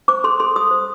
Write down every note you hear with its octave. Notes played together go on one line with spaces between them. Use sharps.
C5 D6
A4 C6
A4 C6
A4 D#6
C5